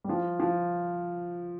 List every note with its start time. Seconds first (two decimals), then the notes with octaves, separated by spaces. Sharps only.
0.04 G3
0.09 F3
0.40 F3